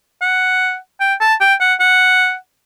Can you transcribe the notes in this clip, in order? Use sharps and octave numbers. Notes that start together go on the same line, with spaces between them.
F#5
G5
A5
G5
F#5
F#5